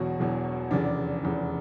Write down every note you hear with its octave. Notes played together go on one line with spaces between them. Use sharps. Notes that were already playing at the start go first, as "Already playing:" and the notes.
Already playing: E1 E2 B2 F#3 F#4
E1 E2 B2 F#3
F1 E2 C#3 D4
F1 E2 C#3